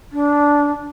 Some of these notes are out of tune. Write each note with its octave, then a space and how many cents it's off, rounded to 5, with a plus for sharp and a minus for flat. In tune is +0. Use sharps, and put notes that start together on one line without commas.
D4 -15